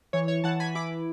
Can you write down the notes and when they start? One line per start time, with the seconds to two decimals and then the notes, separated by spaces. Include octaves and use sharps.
0.13 E3 C#5
0.28 C#5
0.44 E3 F#5 A5
0.60 G#5 B5
0.75 E4 B5 D6